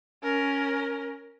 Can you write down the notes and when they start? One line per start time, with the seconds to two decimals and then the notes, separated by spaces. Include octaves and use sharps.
0.23 C#4 A#4